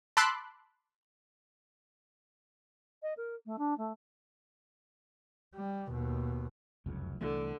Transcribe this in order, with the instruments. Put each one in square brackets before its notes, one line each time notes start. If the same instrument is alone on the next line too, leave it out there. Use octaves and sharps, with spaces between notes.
[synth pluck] A5 B5 C6 D6 E6 F#6
[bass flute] D#5
A#4
A3
D4
A3
[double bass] G3
D#2 B2
[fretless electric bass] F1 C#2 F#2
[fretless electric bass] C2 E3 A3 [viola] D3